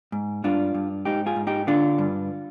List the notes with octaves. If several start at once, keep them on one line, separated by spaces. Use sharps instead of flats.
G#2
G2 D4 F4
G2
G#2 D#4 G4
F4 G#4
G#2
D#4 G4
D3 D4 F4
G2